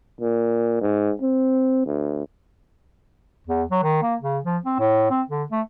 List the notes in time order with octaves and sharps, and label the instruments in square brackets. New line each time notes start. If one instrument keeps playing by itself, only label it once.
[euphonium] A#2
G#2
C4
D2
[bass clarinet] E2
F#3
D#3
A#3
C#3
F3
C4
A2
C4
D3
A3